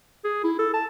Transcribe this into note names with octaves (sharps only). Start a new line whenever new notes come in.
G#4
E4
A4
A5